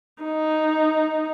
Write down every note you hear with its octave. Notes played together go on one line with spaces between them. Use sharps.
D#4